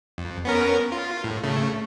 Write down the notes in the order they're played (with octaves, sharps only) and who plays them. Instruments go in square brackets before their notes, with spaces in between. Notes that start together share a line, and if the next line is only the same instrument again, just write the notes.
[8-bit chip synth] F2
B3 C#4 A#4
F4
A2
C#3 A3